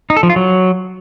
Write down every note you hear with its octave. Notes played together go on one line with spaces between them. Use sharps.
D#4
A4
F3
F4
F#3